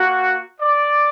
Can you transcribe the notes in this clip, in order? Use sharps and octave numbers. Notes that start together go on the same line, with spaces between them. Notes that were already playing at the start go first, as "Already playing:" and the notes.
Already playing: A#3 F#4
D5